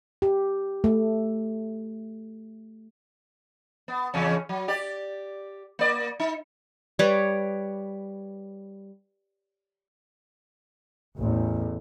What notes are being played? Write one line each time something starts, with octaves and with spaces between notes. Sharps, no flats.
G4
A3
B3
E2 C#3 C#4
F#3
G4 D5
A#3 D5
D#4
G3 B4 C#5 D6
A1 E2